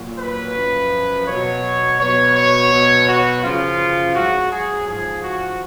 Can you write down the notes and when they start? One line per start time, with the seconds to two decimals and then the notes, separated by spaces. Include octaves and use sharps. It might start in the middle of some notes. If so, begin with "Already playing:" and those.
Already playing: A#2 F#3
0.20 B4
0.56 F#2 F3
1.28 B2 F#3 C#5
2.00 B2 F#3 C#5
2.35 C#5
2.72 B2 F#3
3.08 F#4
3.43 F#2 C#3 F3 F4
4.15 G#2 F#3 F#4
4.52 G#4
4.87 G#2 F3 G#4
5.23 F#4